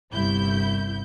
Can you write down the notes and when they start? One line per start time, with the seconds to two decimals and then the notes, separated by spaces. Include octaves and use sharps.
0.13 G1 C2 E4 G6